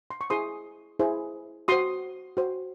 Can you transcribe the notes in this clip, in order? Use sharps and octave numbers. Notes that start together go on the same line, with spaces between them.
C6
C#6
E4 G#4 C5 C6 D#6
E4 G#4 C5
F#4 C5 C6 D#6
F#4 C5